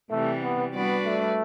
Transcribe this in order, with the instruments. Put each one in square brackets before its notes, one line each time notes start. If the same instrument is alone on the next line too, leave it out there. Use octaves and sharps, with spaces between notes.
[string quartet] C3 E3 G3 [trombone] A3
[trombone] B3
[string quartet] G3 D4 F#4 B4 D5 [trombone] B3
[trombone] A3